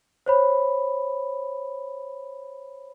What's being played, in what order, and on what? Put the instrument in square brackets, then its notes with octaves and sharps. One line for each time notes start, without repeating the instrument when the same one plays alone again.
[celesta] C5 C#5 B5